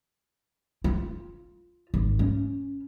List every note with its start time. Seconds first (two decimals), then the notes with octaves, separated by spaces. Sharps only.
0.84 F4
1.94 G#1
2.19 C#4